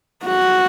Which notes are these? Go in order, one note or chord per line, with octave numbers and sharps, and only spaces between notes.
F#4